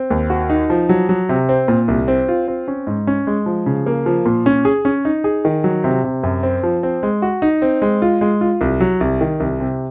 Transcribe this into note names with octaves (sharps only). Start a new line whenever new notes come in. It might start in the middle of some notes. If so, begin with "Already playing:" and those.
Already playing: C4
D#2
F#4
D#4
F3
F#3
F#3
C3
C4
A#2
C2
C4
F4
C4
C#4
G#2
C#4
G#3
F3
C#3
A#3
F3
A#2
C#4
G#4
C#4
D#4
G#4
D#3
F#3
C3
C3
F#2
C4
F3
C4
G#3
F#4
D#4
C4
G#3
F4
G#3
F4
C2
F#3
C2
D#3
C2
C3